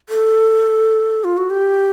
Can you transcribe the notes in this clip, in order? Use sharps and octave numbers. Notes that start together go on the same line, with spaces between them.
A4
F4
F#4
G4